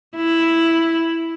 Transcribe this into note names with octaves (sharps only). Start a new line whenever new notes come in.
E4